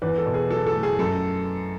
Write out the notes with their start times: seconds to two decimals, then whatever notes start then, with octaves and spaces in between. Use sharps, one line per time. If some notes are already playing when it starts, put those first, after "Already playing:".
0.02 E2 B4
0.18 A4
0.26 B2
0.34 G#4
0.50 F#3 A4
0.67 A4
0.75 A3
0.83 G#4
0.99 F#2 A4